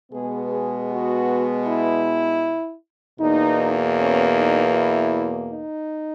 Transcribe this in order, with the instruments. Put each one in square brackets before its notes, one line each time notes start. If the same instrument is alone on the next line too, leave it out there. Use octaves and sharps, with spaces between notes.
[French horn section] B2 G#3 B3 G#4
G#4
F#4
E4
E2 B2 A#3 D#4
C#4
D#4
E4
D#4